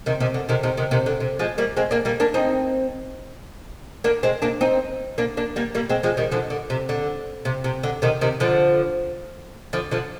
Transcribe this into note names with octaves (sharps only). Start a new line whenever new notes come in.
C3 D#3
C3 D#3
D3
C3 D#3
C3 D#3
C3 D#3
C3 D#3
D3
C3
F3 G#3
G3 A#3
G#3 C4
A#3 D4
G3 A#3
A#3 D4
C4 D#4
A#3 D4
G#3 C4
A#3 D4
C4 D#4
A#3 D4
A#3 D4
G3 A#3
G3 A#3
G#3 C4
F3 G#3
D#3 G3
D3 F3
D3
C3
D3
C3
C3
D3
C3 D#3
C3 D#3
D3 F3
D3 F3
D3 F3